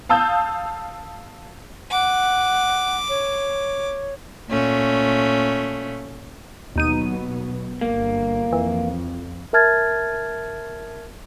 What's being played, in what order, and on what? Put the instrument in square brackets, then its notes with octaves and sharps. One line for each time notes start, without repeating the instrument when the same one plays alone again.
[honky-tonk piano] F5 A5 D#6 E6 G6
[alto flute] F#5 [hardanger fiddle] D6
[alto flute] C#5
[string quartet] A#2 A3 C#4
[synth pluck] D#2 D#4 D#7 [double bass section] B2 F#3 B3
[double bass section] G1 [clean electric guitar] A#3
[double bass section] F2 [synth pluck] E3
[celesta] A#4 E5 A5 F6 G#6 A6